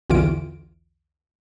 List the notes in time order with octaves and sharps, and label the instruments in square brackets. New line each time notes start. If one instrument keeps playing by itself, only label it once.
[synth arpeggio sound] B1 E2 D3 E3 F4 D7